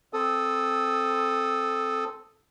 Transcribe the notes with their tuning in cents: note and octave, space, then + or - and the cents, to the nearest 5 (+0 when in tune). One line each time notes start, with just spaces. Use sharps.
C4 +0 A4 -5 D#6 +0